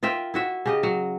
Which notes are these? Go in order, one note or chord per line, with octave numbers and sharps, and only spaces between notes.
F4 A#4 E5 G5
E4 F#4 E5
C#3 G4 D#5
F#3